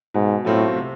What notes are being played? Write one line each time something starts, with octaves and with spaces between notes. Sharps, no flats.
G#2 B2
A2 F#3 A3 C4 F4
C3